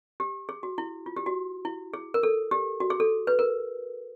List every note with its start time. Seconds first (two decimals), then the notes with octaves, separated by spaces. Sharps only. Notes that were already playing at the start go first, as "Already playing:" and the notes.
0.20 G4
0.49 G#4
0.63 F#4
0.78 E4
1.06 F4
1.16 G4
1.26 F#4
1.65 E4
1.94 G#4
2.14 A#4
2.23 A4
2.51 G4
2.80 F#4
2.90 G#4
3.00 A4
3.27 B4
3.39 A#4